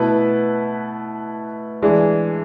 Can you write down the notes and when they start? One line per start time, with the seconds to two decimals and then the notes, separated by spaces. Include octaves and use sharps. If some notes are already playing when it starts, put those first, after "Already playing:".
Already playing: B2 A3 E4 B4
1.82 E3 G#3 D4